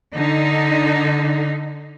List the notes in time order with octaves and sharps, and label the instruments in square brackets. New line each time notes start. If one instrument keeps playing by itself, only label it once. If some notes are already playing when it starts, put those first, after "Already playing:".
[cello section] D3 D#4